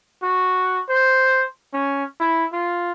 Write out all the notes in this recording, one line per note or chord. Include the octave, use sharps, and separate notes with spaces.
F#4
C5
C#4
E4
F4